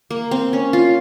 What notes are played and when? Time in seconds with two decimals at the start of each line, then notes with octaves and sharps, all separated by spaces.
0.11 A#3
0.31 C4
0.53 C#4
0.73 F4